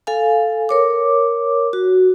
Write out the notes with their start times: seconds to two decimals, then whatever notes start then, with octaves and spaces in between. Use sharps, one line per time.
0.07 A4 F5 G#5
0.69 A#4 C#5 D6
1.73 F#4